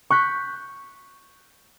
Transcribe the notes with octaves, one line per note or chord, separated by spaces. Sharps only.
C#6 F#6 G6 B6